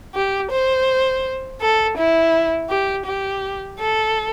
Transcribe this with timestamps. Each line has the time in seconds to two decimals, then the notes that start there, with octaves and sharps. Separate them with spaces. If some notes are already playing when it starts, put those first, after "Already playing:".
0.14 G4
0.51 C5
1.61 A4
1.97 E4
2.69 G4
3.06 G4
3.79 A4